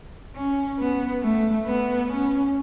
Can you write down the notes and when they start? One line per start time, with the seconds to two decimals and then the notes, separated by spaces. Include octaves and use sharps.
0.36 C#4
0.79 B3
1.23 A3
1.65 B3
2.09 C#4